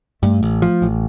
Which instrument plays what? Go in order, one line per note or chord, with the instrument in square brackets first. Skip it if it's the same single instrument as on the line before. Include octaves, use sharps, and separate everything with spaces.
[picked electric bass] G2 [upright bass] A3
[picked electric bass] A1
F3
A1